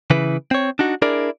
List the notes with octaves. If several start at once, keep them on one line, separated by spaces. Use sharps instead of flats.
C#3 E3 E4 B4
C4 C#5
D4 D#4 F#4
D4 E4 G#4 A#4 D5